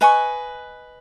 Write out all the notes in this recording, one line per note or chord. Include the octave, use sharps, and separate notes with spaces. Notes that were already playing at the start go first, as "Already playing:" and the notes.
B4 D#5 G#5 C#6